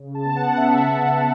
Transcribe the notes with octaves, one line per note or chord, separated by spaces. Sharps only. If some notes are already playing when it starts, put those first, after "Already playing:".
Already playing: C#3
A5
B3
F#5
C#3 E5
C#3